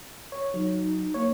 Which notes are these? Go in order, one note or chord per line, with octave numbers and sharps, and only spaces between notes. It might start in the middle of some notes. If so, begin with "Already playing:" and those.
C#5
F#3 D#4
A#3 C#5